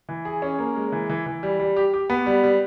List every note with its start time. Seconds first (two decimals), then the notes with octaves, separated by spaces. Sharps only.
0.09 E3
0.25 G#4
0.42 C#4
0.59 A#3
0.76 G#3
0.92 E3
1.10 E3
1.26 E3
1.43 G3
1.60 G3
1.76 G4
1.94 G4
2.10 B3
2.26 G3
2.43 G3